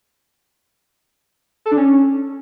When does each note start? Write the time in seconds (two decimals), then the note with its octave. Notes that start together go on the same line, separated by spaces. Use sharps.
1.66 A4
1.71 D4
1.77 C#4